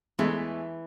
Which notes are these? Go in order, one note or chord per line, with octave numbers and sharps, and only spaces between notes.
E2 E3 G#3 A3